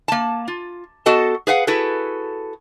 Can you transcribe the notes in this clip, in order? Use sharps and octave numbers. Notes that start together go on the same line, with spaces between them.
A#3 A5
F4
B3 F#4 A4 D#5 A5
G#4 B4 F5 F#5
E4 F#4 G#4 A4 B4